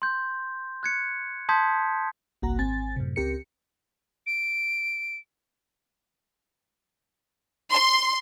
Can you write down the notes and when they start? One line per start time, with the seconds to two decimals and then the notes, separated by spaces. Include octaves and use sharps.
0.02 C6 G6
0.83 F#6 G#6 C#7
1.49 A5 C6 D#6 G6 G#6 B6
2.42 G1 C2 A#3 F#4 F#5 A#5
2.59 G#1 C4 G#5 A6
2.96 F#2 A2 C3
3.16 C#2 C4 G4 A#4 C#7
4.26 D7
7.72 C6